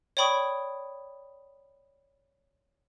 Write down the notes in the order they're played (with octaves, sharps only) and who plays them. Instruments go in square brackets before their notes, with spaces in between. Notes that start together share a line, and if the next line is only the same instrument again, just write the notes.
[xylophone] C#5 D5 G5 B5 C#6 D#6